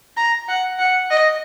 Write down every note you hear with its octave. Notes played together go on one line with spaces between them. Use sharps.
A#5
F#5
F#5
D#5